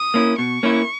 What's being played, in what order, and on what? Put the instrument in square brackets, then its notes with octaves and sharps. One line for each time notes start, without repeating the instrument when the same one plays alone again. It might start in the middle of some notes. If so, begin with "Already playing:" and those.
Already playing: [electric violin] D#6
[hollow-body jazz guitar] A#3 C#4 E4
[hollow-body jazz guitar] B2 [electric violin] C#6
[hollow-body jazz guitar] A#3 C#4 E4